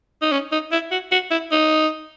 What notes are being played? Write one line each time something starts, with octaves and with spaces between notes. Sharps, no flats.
D#4
C#4
D#4
E4
F#4
F#4
E4
D#4